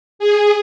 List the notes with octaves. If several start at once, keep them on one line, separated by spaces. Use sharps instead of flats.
G#4